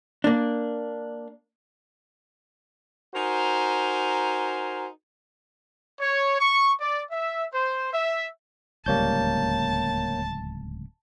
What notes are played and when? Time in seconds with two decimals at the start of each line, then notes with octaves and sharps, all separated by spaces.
0.24 A#3 D4
3.15 D#4 F#4 A#4 C5 G#5
6.00 C#5
6.39 C#6
6.80 D5
7.11 E5
7.54 C5
7.93 E5
8.86 D1 C#2 G3 A#3 C#5 A5 G6